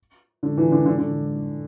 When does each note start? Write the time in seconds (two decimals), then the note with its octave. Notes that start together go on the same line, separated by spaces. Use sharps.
0.43 D3
0.57 E3
0.72 D3
0.86 D3
0.98 D3